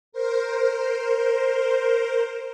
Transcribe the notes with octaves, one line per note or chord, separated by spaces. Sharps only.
A#4 C5